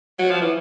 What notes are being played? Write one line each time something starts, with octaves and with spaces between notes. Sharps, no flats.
F#3
F3
E3